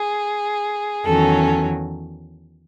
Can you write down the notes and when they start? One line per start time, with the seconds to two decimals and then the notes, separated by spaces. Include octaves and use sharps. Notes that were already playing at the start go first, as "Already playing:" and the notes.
Already playing: G#4
1.04 E2 D#3 F#3 C#4 A4